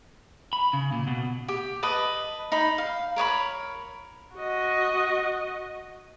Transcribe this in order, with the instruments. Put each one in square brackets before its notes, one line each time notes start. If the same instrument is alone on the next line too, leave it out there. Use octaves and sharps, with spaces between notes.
[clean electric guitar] B5
C#3
A#2
B2
[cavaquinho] G4
B4 D#5 A5
D#4 B5
F5
A#4 C#5 D5 B5
[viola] F#4 D#5